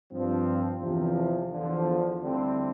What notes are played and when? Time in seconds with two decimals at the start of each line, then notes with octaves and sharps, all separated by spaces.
0.12 G2 F3 C4
0.81 E2 C3 F3
1.51 E2 D3 F3
2.20 D2 D3 G3 C4 E4